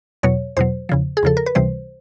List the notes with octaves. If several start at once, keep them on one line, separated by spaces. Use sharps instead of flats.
E2 B2 F#3 C#5
E2 B2 F#3 C5
E2 C#3 F3
G#4
E2 C#3 F3 A4
A#4
B4
C#2 C3 E3 G3 C5